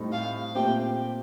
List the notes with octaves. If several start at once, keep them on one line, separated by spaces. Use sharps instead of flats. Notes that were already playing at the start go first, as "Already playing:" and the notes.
Already playing: A2 G3 C4 D#4 A4
F5
A#2 A3 C4 G4 G5